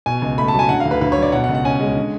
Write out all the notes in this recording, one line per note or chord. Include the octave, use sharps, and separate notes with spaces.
B2 G#5
C#2
A3 B5
A5
F#3 G#5
D3 F#5
F5
D2
B4
D2 B4
C#5
F#3
D5
B2 F#5
F#5
C#2
F#5
C#4 G#5
G#3
D3